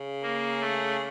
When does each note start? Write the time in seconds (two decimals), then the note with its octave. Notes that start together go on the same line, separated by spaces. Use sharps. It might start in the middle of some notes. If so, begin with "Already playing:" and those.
Already playing: C#3
0.22 A#3
0.60 A3